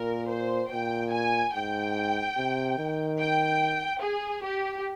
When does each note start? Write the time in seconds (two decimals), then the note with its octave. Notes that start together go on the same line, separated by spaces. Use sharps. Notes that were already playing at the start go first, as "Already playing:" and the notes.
Already playing: A#2 A#4
0.30 C5
0.72 A#2 G5
1.13 G#5
1.54 G#2 G5
2.37 C3
2.78 D#3
3.19 G5
4.02 G#4
4.43 G4